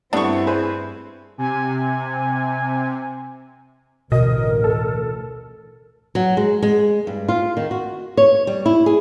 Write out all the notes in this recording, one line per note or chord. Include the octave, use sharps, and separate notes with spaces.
G2 G3 A3 B3 C4 D4 E4 C#6
G#4 B4 C5
C3 G#5
A1 D2 B2 A#4 D#5
A4
F#3
G#3
G#3
G2
F4
D#3
F#4
C#5
G3
E4
G#4